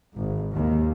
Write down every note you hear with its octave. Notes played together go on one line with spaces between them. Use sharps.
G#1
D#2